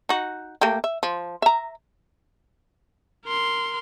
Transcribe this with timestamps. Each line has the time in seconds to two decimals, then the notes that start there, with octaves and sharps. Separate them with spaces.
0.09 D#4 F#4
0.61 A3 A#3 G4
0.84 E5
1.03 F3
1.42 E5 A#5
3.25 A#4 C6